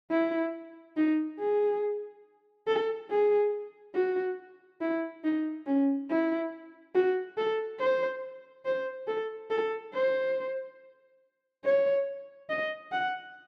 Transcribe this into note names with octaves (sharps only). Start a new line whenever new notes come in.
E4
D#4
G#4
A4
G#4
F#4
E4
D#4
C#4
E4
F#4
A4
C5
C5
A4
A4
C5
C#5
D#5
F#5